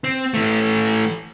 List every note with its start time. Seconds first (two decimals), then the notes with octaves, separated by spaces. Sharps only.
0.04 C4
0.34 E3 A3